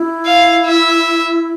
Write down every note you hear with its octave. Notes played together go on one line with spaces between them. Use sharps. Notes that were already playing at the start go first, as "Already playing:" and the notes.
Already playing: E4
F5
E5